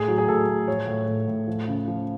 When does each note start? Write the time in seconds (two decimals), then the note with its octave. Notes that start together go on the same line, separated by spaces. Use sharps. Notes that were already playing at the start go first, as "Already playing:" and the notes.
Already playing: A2 G#4
0.08 F#3
0.18 G#4
0.28 A2 A4
0.48 A2
0.67 F3 C#5
0.87 A2
1.08 A2
1.28 A2
1.47 F3
1.68 C#3
1.88 F3